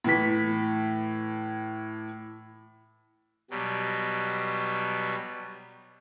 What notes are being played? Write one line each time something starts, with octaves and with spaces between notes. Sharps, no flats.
A2 E3 B6
B2 F#3 G3